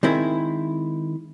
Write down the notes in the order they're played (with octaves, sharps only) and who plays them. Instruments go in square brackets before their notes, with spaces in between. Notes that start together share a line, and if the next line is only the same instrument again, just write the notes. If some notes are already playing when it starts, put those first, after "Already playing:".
[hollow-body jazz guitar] D#3 G#3 C4 E4